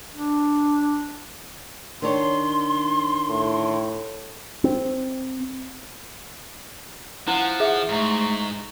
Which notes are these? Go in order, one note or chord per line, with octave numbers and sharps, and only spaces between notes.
D4
D#3 D4 C#5 C6
A2
C4
F3 E4 F#5
G#4 E5
G#2 A3 A#5 C#6